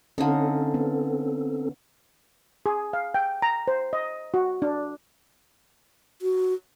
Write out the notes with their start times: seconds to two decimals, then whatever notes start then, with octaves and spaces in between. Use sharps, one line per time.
0.18 D3 C4 C#4 D#4 A4 F5
0.74 B3
2.66 G#4
2.93 F5
3.14 G5
3.42 A#5
3.68 C5
3.93 D#5
4.34 F#4
4.62 D4
6.22 F#4